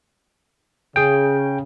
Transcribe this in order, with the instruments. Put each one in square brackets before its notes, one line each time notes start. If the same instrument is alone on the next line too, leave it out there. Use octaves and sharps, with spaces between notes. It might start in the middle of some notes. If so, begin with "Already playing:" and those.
[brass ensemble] C#3 [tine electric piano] G#4 G5